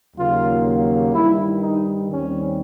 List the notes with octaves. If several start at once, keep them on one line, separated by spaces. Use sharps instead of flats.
D#2 C#3 F#3 A#3 F4
G2 D#3 G3 E4
D#4
D#2 D#3 G3 C4 C#4